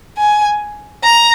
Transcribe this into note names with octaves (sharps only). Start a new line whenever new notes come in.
G#5
A#5